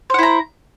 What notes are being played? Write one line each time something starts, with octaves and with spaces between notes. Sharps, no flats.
E4 C5 F#5 A#5